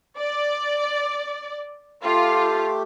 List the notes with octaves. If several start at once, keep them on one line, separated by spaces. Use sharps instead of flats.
D5
A3 F4 G4